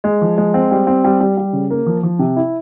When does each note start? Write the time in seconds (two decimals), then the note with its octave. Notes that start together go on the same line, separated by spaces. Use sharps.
0.04 G#3
0.21 F3
0.38 G#3
0.54 C4
0.71 G3
0.87 C4
1.04 G3
1.20 G3
1.37 G3
1.53 C#3
1.71 A#3
1.86 F3
2.03 F3
2.19 C3
2.36 E4